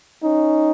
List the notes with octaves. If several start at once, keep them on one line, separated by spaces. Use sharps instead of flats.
C#4 D#4